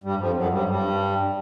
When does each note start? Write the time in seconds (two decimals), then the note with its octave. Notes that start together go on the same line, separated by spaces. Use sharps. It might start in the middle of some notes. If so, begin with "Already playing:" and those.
0.04 G2 G3
0.20 F2 F3
0.36 F#2 F#3
0.52 G2 G3
0.69 G2 G3